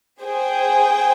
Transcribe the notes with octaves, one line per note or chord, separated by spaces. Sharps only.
G#4 C5 G5